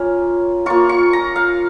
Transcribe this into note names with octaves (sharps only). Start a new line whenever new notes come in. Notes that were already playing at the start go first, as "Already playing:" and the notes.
Already playing: A#3 C#4 F4
A#3 F4 C#6
C#6
A#5
F5